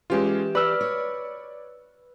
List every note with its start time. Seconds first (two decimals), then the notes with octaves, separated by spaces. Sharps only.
0.10 E3 G#3 C#4 F4 G4 E5
0.55 B4 D5 E6 F6
0.81 C#5